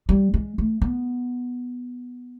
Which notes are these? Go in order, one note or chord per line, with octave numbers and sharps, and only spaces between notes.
G3
G#3
A3
B3